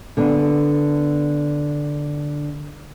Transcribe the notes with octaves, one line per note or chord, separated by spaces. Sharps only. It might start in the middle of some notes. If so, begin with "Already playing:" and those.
D3 B3 D4